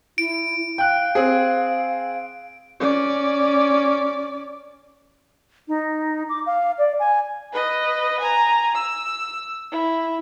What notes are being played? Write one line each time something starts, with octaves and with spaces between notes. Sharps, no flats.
E4 D7
F5 G5 F#6
C4 G#4
C#4 D5
D#4
D6
F5
D5
G#5
B4 D#5
G#5 A#5
E6
E4